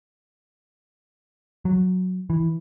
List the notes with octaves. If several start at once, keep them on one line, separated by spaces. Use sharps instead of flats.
F#3
E3